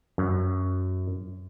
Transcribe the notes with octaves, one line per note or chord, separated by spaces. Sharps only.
F#2